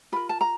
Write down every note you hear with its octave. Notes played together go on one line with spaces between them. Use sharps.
F4 A#4 B5
A5
A#5